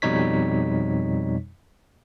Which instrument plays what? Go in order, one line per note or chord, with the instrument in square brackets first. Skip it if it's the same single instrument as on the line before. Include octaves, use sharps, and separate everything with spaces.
[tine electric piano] F2 B2 G3 D#4 C#5 B6